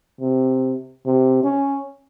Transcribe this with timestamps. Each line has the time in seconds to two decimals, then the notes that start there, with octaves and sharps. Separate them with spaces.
0.20 C3
1.06 C3
1.44 C#4